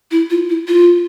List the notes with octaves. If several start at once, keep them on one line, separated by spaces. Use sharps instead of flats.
E4
F4
E4
F4